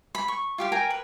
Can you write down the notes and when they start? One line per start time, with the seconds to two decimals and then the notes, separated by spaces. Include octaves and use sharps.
0.15 B5
0.28 C#6
0.58 F4 G4 F5
0.72 A#4 G5 G#5 A#5
0.90 B4